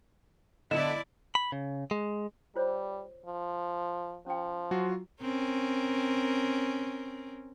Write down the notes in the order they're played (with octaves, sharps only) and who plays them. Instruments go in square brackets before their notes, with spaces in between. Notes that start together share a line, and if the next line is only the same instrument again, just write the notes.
[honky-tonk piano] D3 B3 [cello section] E4 D5 [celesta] D#5 E7
[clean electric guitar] B5
C#3
G#3
[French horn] G3 [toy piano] F4 C5 C#5
[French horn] F3
[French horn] F3 [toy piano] C#4 G5
[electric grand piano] F#3 F4 F#4
[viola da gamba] C4 C#4 A#4